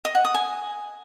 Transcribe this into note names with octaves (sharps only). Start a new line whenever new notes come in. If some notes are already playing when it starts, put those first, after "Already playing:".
D#5
F#5
D#6
G#5